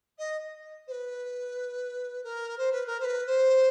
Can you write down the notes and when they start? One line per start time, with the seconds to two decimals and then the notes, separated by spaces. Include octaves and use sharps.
0.18 D#5
0.87 C5
0.91 B4
2.23 A#4
2.58 C5
2.72 B4
2.86 A#4
3.00 C5
3.04 B4
3.26 C5